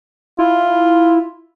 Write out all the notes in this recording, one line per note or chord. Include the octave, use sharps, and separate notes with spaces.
E4 F4